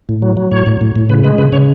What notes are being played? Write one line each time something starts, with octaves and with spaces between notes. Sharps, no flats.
A2
F#3
F#3
A2 C#5
A2
A2
A2
C#3 B4
G#3 B4
C#3 B4
C#3 C#5